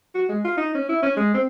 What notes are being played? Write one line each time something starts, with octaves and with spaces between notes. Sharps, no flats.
F#4
G#3
F4
D#4
C#4
E4
C#4
G#3
C4